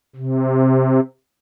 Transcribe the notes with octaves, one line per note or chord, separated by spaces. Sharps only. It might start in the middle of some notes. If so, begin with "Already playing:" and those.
C3